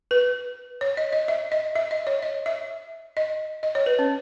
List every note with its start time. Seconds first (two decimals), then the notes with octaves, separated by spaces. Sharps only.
0.11 B4
0.81 C#5
0.97 D#5
1.13 D#5
1.28 E5
1.52 D#5
1.76 E5
1.91 D#5
2.07 C#5
2.22 D#5
2.46 E5
3.17 D#5
3.63 D#5
3.75 C#5
3.86 B4
3.99 C#4